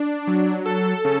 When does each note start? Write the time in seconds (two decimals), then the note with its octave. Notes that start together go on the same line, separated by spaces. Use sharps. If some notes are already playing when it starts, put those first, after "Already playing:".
Already playing: D4
0.27 F#3
0.66 A4
1.04 C#3